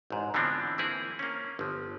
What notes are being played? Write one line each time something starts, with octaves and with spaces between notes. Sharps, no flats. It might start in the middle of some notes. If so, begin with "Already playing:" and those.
A1 G#2
D3 E3 F3 B3 C4 D4
E3 A#3 C4 E4 G#4
A#3 C#4
G1 F3